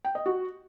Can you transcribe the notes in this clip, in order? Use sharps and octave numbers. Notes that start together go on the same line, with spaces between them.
G5
D#5
F#4